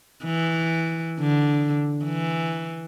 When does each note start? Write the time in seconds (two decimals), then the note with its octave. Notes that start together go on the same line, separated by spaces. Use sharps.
0.24 E3
1.19 D3
2.04 E3